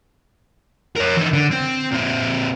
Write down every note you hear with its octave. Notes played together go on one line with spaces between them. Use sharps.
A#4 C#5
E3 D#4
D3
C4
A#2 C4